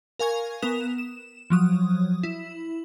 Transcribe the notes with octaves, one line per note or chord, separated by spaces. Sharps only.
A#4 F5 G#5 C#6 G#6
B3 A#4 D#6 E7 F7
E7
F3 F#3 D#6
E4